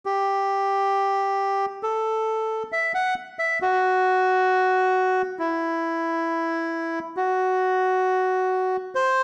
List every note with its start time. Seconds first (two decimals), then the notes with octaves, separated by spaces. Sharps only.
0.06 G4
1.83 A4
2.72 E5
2.94 F#5
3.39 E5
3.62 F#4
5.39 E4
7.17 F#4
8.95 C5